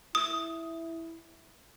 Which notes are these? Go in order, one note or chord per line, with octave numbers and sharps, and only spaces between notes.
E4 D#6